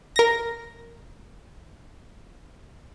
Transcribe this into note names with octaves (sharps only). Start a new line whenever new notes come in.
A#4 A#6